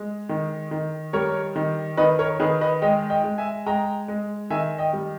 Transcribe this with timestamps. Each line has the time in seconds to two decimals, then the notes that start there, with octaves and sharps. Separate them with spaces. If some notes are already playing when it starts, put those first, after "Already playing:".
Already playing: G#3
0.29 D#3
0.71 D#3
1.13 G3 A#4 C#5
1.56 D#3
1.97 D#3 B4 D#5
2.19 A#4 C#5
2.40 D#3 G#4 B4
2.61 B4 D#5
2.82 G#3 D#5 G5
3.10 D#5 G5
3.24 G#3
3.38 E5 G#5
3.66 G#3 G5 A#5
4.08 G#3
4.50 D#3 E5 G#5
4.79 D#5 G5
4.93 G3